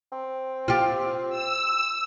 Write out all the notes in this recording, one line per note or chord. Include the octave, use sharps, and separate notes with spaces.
C4
F4 G4
E6